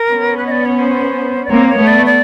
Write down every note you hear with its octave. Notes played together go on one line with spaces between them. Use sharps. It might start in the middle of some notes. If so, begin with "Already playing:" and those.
Already playing: A#4
B3 C#4
B4
D#5
D5
C#5
C5
D5
A#3 C4 C#5
C#5
A3 B3
D5
D5